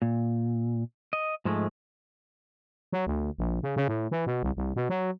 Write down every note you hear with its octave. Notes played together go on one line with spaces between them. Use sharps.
A#2
D#5
G#2 F3 G#3 A3
F#3
D2
A#1
C#3
C#3
A2
E3
B2
C2
C2
B2
F#3